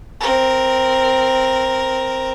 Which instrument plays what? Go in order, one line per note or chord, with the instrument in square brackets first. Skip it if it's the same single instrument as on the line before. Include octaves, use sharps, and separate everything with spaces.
[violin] C4 A#4